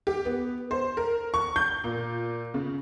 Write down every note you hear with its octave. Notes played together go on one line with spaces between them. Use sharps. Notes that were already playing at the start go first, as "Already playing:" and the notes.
G4
B3
C5
A#4
C#6
G6
A#2
C#3